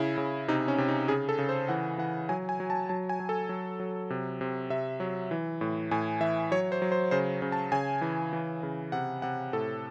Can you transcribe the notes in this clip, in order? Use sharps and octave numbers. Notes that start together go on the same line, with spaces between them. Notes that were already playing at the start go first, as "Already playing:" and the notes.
Already playing: C#3 E4
C#3
C3 D#4
C#4
C3
D#4
C#3 G#4
A4
C#3
C5
E3 F#5
E3 F#5
F#3 G#5
G#5
F#3
A5
F#3 A5
G#5
F#3
A4
F#3
F#3
C3
C3
C3 E5
F#3
E3
A2
A2 G#5
E3 E5
F#3 C#5
C5
F#3
C5
C#3 C5
C#3
A5
C#3 G#5
E3
E3
C#3
C3 F#5
C3 F#5
A2 A4